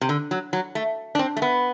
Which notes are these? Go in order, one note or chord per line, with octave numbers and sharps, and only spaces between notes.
C3
D3
F#3
F#3
A3
D4
C4
A3
B3